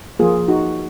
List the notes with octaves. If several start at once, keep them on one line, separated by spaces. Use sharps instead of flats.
F3 A#3 F4 G#4
D#4 F#4